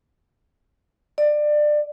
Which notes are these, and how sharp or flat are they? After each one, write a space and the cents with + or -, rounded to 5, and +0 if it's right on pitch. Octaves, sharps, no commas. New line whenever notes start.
D5 +25